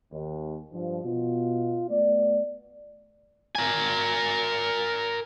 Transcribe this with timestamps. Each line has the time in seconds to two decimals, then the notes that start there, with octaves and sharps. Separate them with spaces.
0.11 D#2
0.72 G2 F3
1.03 B2 F4
1.88 A3 B3 D5
3.55 A#4 G#5